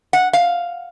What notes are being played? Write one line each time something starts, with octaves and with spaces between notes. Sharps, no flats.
F#5
F5